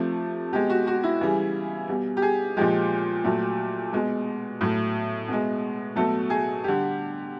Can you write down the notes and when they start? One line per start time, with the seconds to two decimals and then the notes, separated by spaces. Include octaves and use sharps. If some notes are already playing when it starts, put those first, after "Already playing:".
Already playing: C3 F3 A3
0.52 B2 G#3 G4
0.70 F#4
0.87 F#4
1.04 E4
1.21 C#3 E3 G3
1.88 B2 G3
2.17 G4
2.22 G#4
2.57 A#2 F3 G#3 G4
3.24 A#2 F#3 A3
3.93 B2 G#3
4.61 A2 F#3 A3
5.28 B2 G#3
5.96 B2 F#3 A3 A4
6.30 G#4
6.64 D3 G3 G4